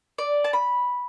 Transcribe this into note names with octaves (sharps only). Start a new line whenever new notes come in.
D5
A5
B5